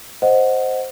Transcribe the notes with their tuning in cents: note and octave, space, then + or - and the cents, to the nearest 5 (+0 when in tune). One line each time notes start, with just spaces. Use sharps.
C5 +0 D#5 +0 F#5 +0